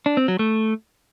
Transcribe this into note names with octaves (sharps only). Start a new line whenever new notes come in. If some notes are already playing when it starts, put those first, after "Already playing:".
D4
C4
F#3
A3